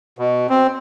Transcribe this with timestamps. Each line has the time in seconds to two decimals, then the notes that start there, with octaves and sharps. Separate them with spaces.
0.19 B2
0.50 C4